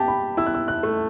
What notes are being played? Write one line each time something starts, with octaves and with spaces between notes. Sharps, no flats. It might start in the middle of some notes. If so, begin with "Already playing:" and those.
Already playing: G4 G5 A5
B5
E4 E6
F#6
E6
F#6
A3